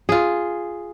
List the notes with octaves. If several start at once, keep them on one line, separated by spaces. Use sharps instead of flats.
F4 G#4